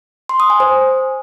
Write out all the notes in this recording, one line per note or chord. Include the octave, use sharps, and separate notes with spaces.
C6
D#6
G#5
C5